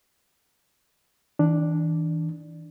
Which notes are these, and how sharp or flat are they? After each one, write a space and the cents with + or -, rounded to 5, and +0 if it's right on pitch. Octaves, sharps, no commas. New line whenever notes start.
E3 -40 D4 +0